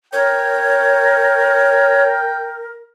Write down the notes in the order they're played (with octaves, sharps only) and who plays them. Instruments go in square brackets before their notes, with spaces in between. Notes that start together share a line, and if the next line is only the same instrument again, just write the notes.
[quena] A#4 [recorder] C#5 [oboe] G5